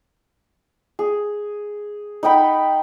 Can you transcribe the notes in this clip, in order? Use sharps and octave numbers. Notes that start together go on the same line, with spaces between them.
G#4
D#4 F#5 G5 B5